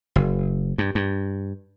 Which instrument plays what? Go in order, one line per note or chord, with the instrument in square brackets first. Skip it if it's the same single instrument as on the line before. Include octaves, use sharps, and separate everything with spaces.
[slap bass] F#1
G2
G2